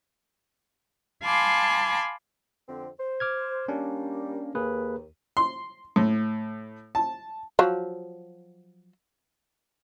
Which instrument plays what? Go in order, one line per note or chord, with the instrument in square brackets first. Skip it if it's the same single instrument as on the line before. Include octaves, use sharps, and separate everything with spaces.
[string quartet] F5 G#5 A5 B5 C6 D6
[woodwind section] F2 D3 C4
C5
[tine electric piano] D6 F6 G#6
[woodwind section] G3 A#3 [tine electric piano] C#4 D4
[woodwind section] D#2 [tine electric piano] A#3 G#4 B4
[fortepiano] C6
A2
A5
[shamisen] F3 F#3